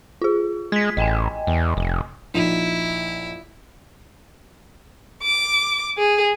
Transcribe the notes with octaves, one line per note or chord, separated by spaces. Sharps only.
F4 G#4
G#3 G#6 B6
A1 D#5 G5 G#5
E2
F1
A#1 D#4 E4
D6
G#4